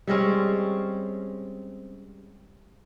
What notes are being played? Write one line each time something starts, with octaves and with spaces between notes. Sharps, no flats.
G3 G#3 C4 C#4